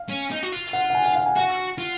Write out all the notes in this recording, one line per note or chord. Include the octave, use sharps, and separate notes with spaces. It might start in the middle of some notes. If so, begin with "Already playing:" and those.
Already playing: F5
C#4
D#4
F#4
F4
F#5
F#5
G#5
F#5
F5
F#5
G#5
F#4 F#5
F4